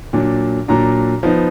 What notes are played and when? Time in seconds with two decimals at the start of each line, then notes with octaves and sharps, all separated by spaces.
0.13 A#2 F#3 D4
0.68 A#2 F#3 D4 A#5
1.23 F3 B3 D#4